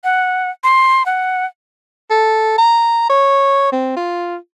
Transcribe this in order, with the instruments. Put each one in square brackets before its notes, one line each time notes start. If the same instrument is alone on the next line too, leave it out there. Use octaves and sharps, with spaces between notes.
[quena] F#5
C6
F#5
[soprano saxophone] A4
A#5
C#5
C4
F4